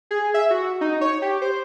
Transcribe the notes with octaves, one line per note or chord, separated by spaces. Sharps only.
G#4
E5
F#4
D#4
C#5
G4
C5